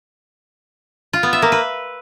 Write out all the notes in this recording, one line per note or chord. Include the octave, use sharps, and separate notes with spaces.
F4
B3
E5
A#3
B4